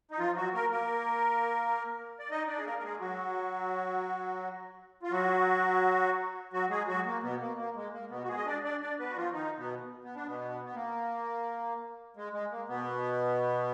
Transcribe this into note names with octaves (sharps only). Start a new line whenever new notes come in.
D#4
F3 F4
F#3 F#4
A#3 A#4
A#3 A#4
D5
D#4 D#5
D4 D5
G#4
A#3 A#4
A#4
G#3 G#4
F#3 F#4
F4
F#3 F#4
F#3 F#4
G#3 G#4
F#3 F#4
A#3
B2 B3
A#3
A#3
G#3
A#3
B2 B3
F#4
G#3 G#4
D#5
D4 D5
D4 D5
D4 D5
B3 B4
F#4
F3 F4
D#3 D#4
B2 B3
B3
D4
B2 B3
B3
A#3
G#3
G#3
A#3
B2 B3